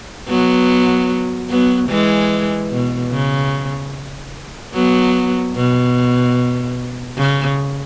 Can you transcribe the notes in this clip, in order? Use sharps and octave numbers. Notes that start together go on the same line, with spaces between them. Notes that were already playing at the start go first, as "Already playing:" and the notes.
F#3 B3
F#3 B3
E3 G#3
B2
C#3
F#3 B3
B2
C#3